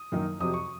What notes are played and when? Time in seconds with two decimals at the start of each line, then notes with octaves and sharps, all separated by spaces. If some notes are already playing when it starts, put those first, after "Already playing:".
Already playing: D#6
0.12 F#2 D#3 A#3 D#4
0.40 F2 C3 F#3 C4 D#6
0.54 C#6